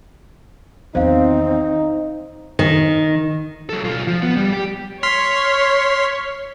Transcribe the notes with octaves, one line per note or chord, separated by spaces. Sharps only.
E2 D#3 C4 D#4 C5 F5
D#3
F#3 A4
B1 F4
F3
B3
G3
G4
C#5 C6 F6 B6